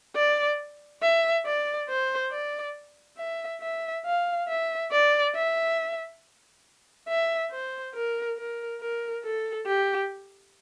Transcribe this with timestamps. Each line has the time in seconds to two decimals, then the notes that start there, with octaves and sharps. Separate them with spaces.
0.16 D5
1.01 E5
1.46 D5
1.89 C5
2.31 D5
3.18 E5
3.61 E5
4.05 F5
4.48 E5
4.91 D5
5.35 E5
7.08 E5
7.51 C5
7.94 A#4
8.37 A#4
8.80 A#4
9.24 A4
9.66 G4